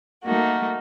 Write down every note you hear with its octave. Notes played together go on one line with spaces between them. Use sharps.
A3 A#3 D#4 F#4